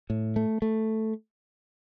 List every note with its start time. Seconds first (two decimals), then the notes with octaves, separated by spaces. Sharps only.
0.10 A2
0.36 A3
0.62 A3